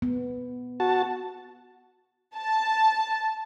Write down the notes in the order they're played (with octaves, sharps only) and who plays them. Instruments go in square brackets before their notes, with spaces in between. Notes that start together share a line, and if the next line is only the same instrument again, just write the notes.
[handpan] B3
[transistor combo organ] F#4 A5
[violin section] A5